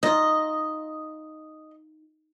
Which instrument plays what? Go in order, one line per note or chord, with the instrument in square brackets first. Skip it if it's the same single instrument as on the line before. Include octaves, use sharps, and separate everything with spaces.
[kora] D#4 F4 [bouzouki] D#5